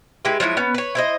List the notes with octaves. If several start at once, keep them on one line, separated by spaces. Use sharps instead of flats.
G#3 E4 G4 B4
F3 F#3 G#3 E4
B3 C#4
B4 C#5
E4 C5 D#5